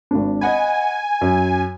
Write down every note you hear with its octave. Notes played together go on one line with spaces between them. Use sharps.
G#1 D4
D#5 F#5 G#5 B5
F#2